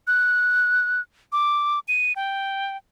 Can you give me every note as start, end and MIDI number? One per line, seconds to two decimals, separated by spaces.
0.07 1.01 90
1.32 1.80 86
1.88 2.13 99
2.16 2.77 79